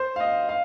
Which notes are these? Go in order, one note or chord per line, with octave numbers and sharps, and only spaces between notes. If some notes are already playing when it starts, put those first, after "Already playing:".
Already playing: C5
F5
D#5
F5